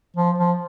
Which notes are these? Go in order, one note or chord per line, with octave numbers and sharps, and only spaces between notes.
F3
F3